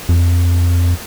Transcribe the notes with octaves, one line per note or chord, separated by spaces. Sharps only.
F2